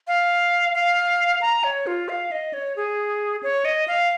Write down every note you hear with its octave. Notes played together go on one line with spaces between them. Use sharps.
F5
F5
A#5
C#5
F4
F5
D#5
C#5
G#4
C#5
D#5
F5